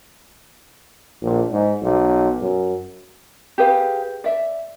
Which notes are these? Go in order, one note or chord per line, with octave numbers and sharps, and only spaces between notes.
A#1
G#2
B1
F#2
G4 G#4 B4 F5
D5 E5